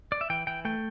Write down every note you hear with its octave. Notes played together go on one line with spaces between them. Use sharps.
D5
E5
E3 G5
E3 G5
A3 G5